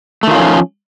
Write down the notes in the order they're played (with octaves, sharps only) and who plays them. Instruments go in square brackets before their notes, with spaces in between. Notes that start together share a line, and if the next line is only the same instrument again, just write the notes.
[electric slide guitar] A3
D#3
F4
C#4
F3